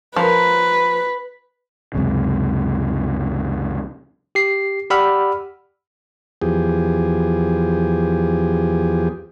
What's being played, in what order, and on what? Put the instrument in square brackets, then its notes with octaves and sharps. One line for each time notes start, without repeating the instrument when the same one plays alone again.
[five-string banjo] F3 A#4 [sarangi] B4
[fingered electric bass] C#2 F#2 C3
[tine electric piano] G4 C7
G4 D5 F#5 B5 E6 F6
[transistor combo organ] E2 F3 G4 G#4